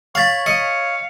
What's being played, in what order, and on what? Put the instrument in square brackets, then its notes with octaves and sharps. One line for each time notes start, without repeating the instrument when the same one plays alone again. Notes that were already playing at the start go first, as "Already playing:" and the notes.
[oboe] C#5 [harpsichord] F5 [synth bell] C#6 A6 B6
[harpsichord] D#5 [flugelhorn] F5 [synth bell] C#7